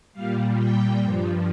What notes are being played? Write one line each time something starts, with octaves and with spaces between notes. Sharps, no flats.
A#2 G3 F5
G5
G2 F3